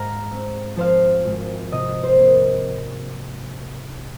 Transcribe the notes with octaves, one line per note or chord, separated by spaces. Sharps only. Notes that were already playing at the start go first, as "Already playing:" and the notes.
Already playing: G#2 F5 A#5
C4
F3 C5 F5
G#1
C3 D#5
C5
A#3